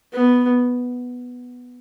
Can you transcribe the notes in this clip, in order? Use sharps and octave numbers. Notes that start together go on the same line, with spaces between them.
B3